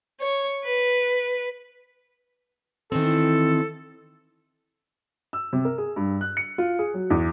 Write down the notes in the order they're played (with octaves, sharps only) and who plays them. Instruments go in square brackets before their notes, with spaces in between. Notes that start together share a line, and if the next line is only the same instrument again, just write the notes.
[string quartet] C#5
B4
[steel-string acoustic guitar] D#3 E3 C4 [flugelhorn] A4
[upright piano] E6
C3
A#4
G#4
G2
F#6
C#7
F4
G#4
F#3
E2